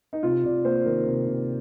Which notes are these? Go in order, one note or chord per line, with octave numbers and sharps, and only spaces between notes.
D#4
C3 F4
C3 D5
A#3 C5
D#3 A#4
C3
C3